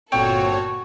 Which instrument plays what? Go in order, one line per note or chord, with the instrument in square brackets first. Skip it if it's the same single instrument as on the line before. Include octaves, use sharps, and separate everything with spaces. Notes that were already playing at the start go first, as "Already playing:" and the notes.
[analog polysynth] G1 A#2 C#5 [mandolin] C4 [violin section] F#4 A4 [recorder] C#6